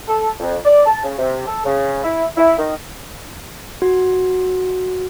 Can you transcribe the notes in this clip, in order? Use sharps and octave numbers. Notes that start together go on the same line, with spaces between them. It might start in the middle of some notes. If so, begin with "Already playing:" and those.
A4
F2
D5
A5
C#3
C3
A4
C#3
E4
E4
D#3
F#4